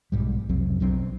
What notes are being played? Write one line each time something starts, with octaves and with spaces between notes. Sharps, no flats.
B1 G#2 G3
C2 F2 F#3 C4
B1 F#3 C4 D4